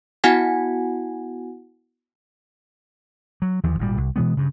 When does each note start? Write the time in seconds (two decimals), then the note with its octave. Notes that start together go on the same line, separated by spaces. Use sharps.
0.24 B3 E4 F#4 F#5 G#5 G#6
3.42 F#3
3.64 D#2 E3 F3
3.79 G#1 A#2 G3
3.97 C2
4.16 B2 E3 G#3 B3
4.37 G2 C#3